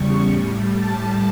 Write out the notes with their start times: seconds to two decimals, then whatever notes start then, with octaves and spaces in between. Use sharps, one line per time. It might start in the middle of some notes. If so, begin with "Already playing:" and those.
Already playing: E2 C#3 G3 C#6
0.32 A2 G3
0.72 A5